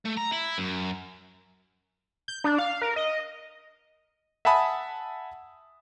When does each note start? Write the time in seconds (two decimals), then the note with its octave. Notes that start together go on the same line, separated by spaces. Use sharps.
0.05 A3
0.17 A#5
0.32 E4
0.58 F#2
2.28 G6
2.44 D4
2.59 F5
2.81 A#4
2.96 D#5
4.45 E5 F#5 G#5 A5 B5 D#6